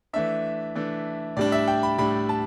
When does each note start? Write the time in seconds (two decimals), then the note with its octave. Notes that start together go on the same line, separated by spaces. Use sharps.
0.13 E3 A3 D4 E5
0.75 E3 A3 D4
1.37 A2 G3 D4 D5
1.52 E5
1.68 G5
1.83 B5
1.98 A2 G3 D4 B5
2.29 A5